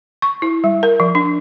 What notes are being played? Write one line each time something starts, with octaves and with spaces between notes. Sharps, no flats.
C#6
E4
G3
A#4
F3
D4